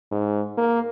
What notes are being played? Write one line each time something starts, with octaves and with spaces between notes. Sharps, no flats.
G#2
A#3